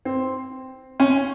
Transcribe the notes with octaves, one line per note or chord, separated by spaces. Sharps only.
C4
C#4